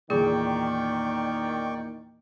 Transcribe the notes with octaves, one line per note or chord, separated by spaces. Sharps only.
E2 A#2 D#3 G#4 D5 G5 C#6